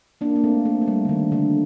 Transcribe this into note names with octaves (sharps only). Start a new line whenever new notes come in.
A#3 D4
A#3
A3 C4
A3
A3
G3
D3
D#3
D3